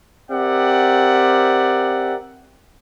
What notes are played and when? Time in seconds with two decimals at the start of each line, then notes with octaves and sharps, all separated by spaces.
0.31 C4 G4 A#4 D5 E5 F#5